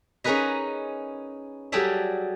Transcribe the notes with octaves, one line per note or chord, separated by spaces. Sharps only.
C#4 D#4 G#4 A#4 B4 D#5
F#3 G3 G#4 A4 D5 E5